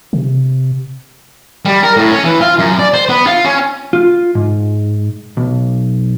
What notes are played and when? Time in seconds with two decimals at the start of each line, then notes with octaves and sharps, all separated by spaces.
0.13 C3
1.65 G3
1.83 A#4
1.97 A2
2.11 C#4
2.24 E3
2.41 F4
2.59 F#2
2.79 D5
2.94 C5
3.09 B3
3.27 F4
3.45 C#4
3.93 F4
4.35 G#2
5.37 B1